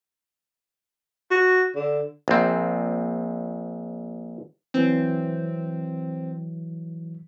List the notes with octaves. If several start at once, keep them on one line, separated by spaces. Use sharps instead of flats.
F#4
D3
A#1 C4
E3 F#3 C4